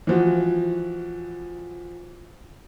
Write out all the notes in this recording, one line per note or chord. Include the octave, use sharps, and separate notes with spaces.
E3 F3 F#4